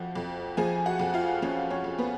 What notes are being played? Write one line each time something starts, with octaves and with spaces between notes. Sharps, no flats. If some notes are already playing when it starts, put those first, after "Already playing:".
Already playing: F2 F3 F#4 F#5
F2
F3 G#4 G#5
F#4 F#5
F2
F4 F5
F3 C#4 C#5
C#4 C#5
F2
B3 B4